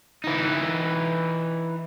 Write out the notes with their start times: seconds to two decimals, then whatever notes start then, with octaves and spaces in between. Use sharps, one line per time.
0.24 E3 D#4